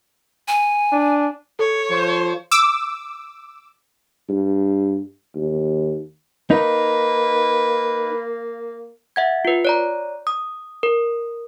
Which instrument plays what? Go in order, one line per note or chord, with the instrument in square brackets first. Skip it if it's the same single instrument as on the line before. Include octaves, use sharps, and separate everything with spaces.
[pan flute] G#5
[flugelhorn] D4
[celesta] A4 [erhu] C#5
[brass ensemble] F3 C5
[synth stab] D6 E6
[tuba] G2
D#2
[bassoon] A#3 [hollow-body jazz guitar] D#4 [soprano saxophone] B4
[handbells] E5 F#5 G#6
F4 B4
C#5 D5 A#5
D#6
A#4